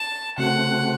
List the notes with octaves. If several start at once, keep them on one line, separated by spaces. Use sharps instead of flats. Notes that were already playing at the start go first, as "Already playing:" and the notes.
Already playing: A5
C#3 A3 C4 F#4 F#5